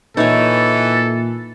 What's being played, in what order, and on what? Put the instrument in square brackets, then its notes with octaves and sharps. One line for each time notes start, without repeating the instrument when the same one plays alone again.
[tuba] A#2 [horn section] E3 [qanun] D#4 C#5 [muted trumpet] A4